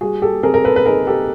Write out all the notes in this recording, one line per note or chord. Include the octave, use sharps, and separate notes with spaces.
G3 F#4 G#4
G4 A4
C4 G#4 A#4
A#4
A4 B4
B4
D#4 G#4 A#4
G4 A4